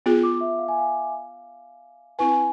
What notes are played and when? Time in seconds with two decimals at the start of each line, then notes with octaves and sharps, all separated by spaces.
0.06 B3 F4 G#4
0.23 D6
0.41 E5
0.59 F5
0.68 G#5
0.78 F5
2.19 C4 E4 B4 G#5